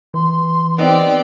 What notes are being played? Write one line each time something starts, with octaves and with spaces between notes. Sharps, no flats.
E3 C6
B3 C4 D#4 G4 D5 G5